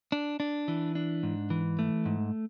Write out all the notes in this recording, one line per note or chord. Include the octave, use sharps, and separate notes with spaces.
D4
D4
E3
D4
G#2
E3
A3
G#2